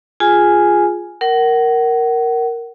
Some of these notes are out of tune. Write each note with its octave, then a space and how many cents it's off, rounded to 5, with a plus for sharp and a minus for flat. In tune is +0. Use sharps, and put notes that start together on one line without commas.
F4 +0 G#4 +0 G#5 +0
A#4 +0 F#5 +30